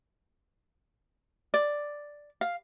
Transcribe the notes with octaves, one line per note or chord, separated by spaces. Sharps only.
D5
F5